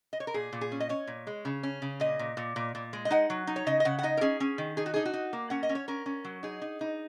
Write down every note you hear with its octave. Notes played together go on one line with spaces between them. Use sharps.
D#5
C#5
A#4
A#2 G#4
A#2
G#4
C#4
D#5
C#4 C#5
A#2
G#3
C#3
C#4
C#3
A#2 D#5
A#2
A#2
A#2
A#2
G#3
D#5
D#4 F#5
F#3
D#4
C#5
C#3 D#5
D#5
C#3 F#5
F#5
D#4 D#5
A#4
C#4 G#4
C#4
D#3
D#4 G#4
F#4
D#4 G#4
F#4
D#4
A#3
C#4 F#5
D#5
C#4
C#5
C#4 A#4
C#4
F#3
D#4 G#4
D#4
D#4